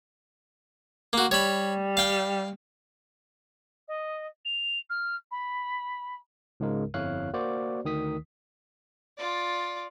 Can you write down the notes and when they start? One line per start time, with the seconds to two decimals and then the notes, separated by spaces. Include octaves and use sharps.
1.13 A#3 F#4
1.31 G3 C#5 B5
1.97 F5 G5
3.88 D#5
4.45 F7
4.89 F6
5.31 B5
6.60 C#2 G#2 C#3 G#3 A#4
6.94 G1 F2 E4 C#5 F5 F#6
7.33 A#3 F#4 C5 D5
7.85 D2 D#3 D#6 B6
9.18 F4 D5